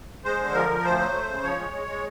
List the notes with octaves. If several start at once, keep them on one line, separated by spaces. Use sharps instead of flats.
G#3 C5
D3
F3 A#4
F3
D2 C5
F#3
A3
C#3
F3 C#5
G#3
G#3
G#3